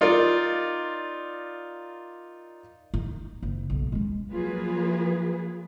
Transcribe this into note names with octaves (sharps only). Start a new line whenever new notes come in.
D#4 F4 A#4 D5
D#4
F#1
B1
G#3 C#4
F3 F#3 A#3 F4 G#4 B4